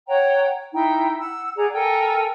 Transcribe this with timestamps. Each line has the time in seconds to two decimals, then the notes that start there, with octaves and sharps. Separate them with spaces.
0.07 C#5 F#5 G5 A#5
0.73 D#4 E4 G5
1.18 F#5 E6
1.56 G#4 D5 F#5 A#5
1.73 A4 A#4 G5 G#5